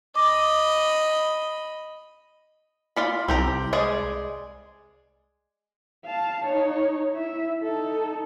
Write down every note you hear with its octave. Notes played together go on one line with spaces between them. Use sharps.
D#5 B5 D6 A#6
F4 D5 B5
C2 C4 G4 A#5
G#3 G#4 D5
F5 A5
D#4 C#5
E4 E5
D#4 A4